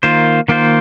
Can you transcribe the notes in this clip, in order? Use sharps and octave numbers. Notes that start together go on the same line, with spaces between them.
D#3 A#3 F4 C5
D#3 A#3 F4 C5